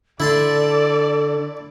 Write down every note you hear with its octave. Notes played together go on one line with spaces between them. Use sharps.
D3 E4 A4 D5 A5 C6